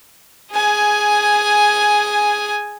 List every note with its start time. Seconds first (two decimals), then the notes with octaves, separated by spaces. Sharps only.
0.52 G#4 G#5